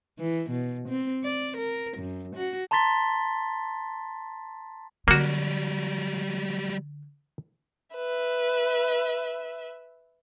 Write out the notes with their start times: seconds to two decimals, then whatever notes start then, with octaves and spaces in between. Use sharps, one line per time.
0.19 E3
0.50 B2
0.89 C4
1.24 D5
1.57 A#4
1.97 F#2
2.36 F#4
2.71 A5 A#5 C6 A6 B6 G7
5.08 D3 F#3 G3 A#3 F#4
7.96 B4 E5